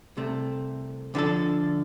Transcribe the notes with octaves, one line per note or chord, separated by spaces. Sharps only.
C2 C3 A3
D2 D3 F3 D4 A4